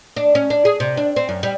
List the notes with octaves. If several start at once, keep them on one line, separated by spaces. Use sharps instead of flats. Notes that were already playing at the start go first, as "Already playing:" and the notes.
D4
C#4
D4
G#4
C3
D4
C4
F#2
G3